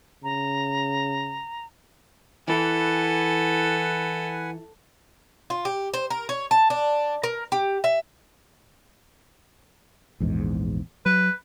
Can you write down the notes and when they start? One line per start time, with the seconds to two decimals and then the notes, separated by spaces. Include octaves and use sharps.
0.24 C#3 A#5
2.48 E3 E4 A4 B4 F#5 G#5
5.50 F4
5.65 G4
5.94 C5
6.10 A#4
6.29 C#5
6.51 A5
6.70 D4
7.24 A#4
7.52 G4
7.84 E5
10.20 A#1 E2 G#2
11.06 F#3 B4